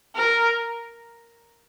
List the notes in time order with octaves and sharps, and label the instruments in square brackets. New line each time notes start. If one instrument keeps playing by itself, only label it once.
[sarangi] A#4